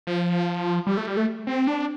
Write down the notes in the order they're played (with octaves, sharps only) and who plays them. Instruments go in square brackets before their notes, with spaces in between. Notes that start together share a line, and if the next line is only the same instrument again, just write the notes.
[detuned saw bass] F3
G3
A3
G3
A3
C4
D4